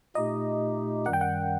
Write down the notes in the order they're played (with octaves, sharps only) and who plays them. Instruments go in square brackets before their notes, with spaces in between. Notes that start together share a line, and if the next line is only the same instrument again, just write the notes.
[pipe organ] A#2 A3 D#4 G4 [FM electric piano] D#5
[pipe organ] F#2 D#3 G3 [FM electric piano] F#5
[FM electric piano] G5
F#5